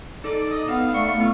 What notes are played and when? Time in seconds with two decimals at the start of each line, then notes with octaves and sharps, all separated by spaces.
0.24 D#4 A4 D5
0.50 D#5
0.68 B3 D#4 F5
0.94 A3 D5 F5 C#6
1.19 B3 E4 F4